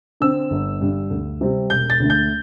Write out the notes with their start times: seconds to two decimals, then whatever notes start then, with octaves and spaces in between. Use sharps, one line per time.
0.20 D3 C4 E6
0.51 G1
0.81 G2 D3
1.10 D2
1.41 C3 G3 C4
1.70 E1 G6
1.90 A6
2.00 D2 D3 A3
2.10 G6